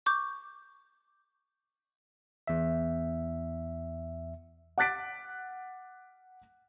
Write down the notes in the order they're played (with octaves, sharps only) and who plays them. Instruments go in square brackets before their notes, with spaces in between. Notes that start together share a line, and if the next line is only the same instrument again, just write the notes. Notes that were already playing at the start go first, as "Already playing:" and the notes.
[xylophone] C#6 D6 G6
[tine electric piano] E2 E5
[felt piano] F#5 D6 F#6 A6 B6 D7